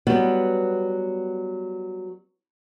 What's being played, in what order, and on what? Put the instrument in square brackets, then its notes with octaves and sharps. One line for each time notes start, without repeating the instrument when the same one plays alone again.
[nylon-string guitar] F#3 G3 B3